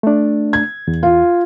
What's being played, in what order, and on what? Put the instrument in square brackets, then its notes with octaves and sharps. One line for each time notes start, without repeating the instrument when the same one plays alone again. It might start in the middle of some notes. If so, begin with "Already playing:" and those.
[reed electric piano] A3 D4
[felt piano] G#6
[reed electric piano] E2
[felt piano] F4